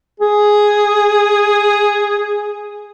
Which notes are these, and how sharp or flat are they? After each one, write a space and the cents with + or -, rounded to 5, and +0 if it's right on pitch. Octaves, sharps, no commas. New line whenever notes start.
G#4 +0